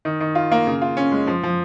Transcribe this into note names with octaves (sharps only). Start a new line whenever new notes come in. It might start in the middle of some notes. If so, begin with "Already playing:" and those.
D#3
D#3
F4
A#3
C#3
F4
C#4
G#3
F3
F3